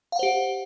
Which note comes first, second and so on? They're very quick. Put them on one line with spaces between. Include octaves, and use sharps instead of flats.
F5 F#5 C5 G4